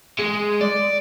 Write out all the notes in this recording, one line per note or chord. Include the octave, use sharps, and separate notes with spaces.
G#3
D5